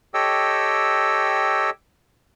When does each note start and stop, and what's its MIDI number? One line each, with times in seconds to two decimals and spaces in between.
0.14 1.70 67
0.14 1.70 69
0.14 1.70 73
0.14 1.70 75
0.14 1.70 79
0.14 1.70 88